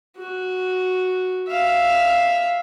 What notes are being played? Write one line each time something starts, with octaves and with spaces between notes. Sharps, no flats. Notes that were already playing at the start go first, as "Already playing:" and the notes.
F#4
E5 F5